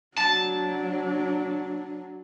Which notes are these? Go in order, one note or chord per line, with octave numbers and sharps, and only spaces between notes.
F#3 D4 A5